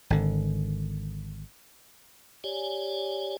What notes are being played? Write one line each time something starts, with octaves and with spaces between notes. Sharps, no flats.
G#1 D3
G4 C#5 D5 G#5